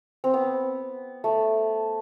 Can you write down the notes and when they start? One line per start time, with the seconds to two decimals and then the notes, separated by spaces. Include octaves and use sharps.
0.24 C4
0.34 B3
1.24 A3